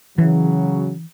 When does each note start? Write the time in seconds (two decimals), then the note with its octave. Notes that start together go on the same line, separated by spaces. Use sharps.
0.18 C#3 E3 F#3